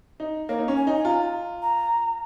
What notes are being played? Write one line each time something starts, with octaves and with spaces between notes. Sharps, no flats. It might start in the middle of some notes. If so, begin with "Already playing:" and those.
D#4
A#3 C#5
D#4
C#4
G#5
D#4
G#5
F4 A#5
A#5